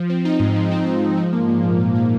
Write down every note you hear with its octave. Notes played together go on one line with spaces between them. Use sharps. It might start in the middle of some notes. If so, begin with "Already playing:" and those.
Already playing: F3
C4
D#4
G#2
F3
C4
D#4
G#2
F3
A#3
A#2
A#2
F3
A#3